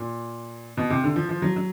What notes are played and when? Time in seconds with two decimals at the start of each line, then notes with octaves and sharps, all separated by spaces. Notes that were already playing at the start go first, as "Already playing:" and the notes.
Already playing: A#2
0.77 B2
0.90 C3
1.04 D3
1.16 F3
1.29 F3
1.42 F#3
1.56 F#3